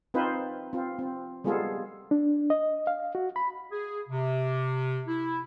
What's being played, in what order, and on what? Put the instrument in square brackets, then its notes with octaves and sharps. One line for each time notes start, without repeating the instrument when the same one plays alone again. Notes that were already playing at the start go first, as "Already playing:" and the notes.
[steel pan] C4 D#4 F4 B4 C5
C4 F4
C4
G3 G#3 B3 F4 G#4 A4
[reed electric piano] D4
D#5
F5
F#4
B5
[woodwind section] G#4
C3
E4